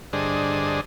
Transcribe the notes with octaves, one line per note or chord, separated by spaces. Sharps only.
G2 D3 D4 G#4 C5 D#5